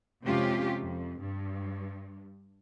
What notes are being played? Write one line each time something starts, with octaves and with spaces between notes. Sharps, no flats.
F2 C3 G#3 C#4 F4 G4
F2
G2